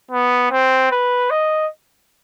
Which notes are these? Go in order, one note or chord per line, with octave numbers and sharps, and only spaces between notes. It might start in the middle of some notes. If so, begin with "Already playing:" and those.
B3
C4
B4
D#5